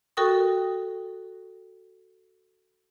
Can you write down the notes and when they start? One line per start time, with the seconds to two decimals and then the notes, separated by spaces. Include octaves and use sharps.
0.17 F#4 A4 A#4 G5 C#6 D#6